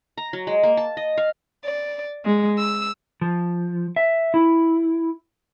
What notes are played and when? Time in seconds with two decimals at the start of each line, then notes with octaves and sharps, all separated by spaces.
0.17 A#5
0.33 F#3
0.47 G#3
0.63 A#3
0.77 A5
0.97 D#5
1.17 F5
1.64 D5
2.25 G#3
2.58 E6
3.21 F3
3.96 E5
4.34 E4